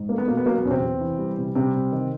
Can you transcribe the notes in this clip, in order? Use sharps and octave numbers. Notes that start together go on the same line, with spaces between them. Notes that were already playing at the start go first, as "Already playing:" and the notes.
Already playing: G#2
A3 A#3
B3
B2 A#3
B3
F#3 A#3
B3
E2 C#4
C3 C4
C3
E3
G3
C3
C3 G3 C4
C3
D#3